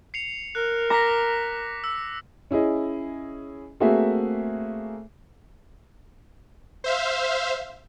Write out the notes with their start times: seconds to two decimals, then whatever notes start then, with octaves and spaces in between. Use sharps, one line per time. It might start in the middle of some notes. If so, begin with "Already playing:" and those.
0.14 C7 C#7 F7
0.55 A#4 F#6
0.90 A#5 D6 A#6 B6
1.84 E6
2.51 C#4 E4 G#4 D#5
3.80 A3 A#3 C4 F#4 G#4 E5
6.84 C5 E5 F5